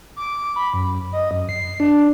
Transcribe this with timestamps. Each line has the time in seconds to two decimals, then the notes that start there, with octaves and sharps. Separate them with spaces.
0.16 D6
0.56 B5
0.73 F#2
1.13 D#5
1.31 F#2
1.49 C7
1.80 D4